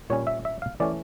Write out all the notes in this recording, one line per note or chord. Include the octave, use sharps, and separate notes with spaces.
A#2 G3 C#4 C#5
E5
E5
F5
E3 A3 C#4 D5